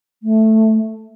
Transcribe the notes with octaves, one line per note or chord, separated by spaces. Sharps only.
A3